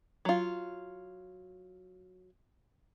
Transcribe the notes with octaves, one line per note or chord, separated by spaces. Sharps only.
F#3 F4